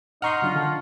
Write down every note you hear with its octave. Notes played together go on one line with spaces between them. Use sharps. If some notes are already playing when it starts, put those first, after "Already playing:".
D#4 F#5 A#5 C6 C#6 F6
C#3 F#3 D4 F4
D3 D#3 A5